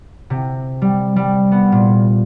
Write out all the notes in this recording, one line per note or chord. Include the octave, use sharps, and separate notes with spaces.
C3
G3
G3
B3
A#2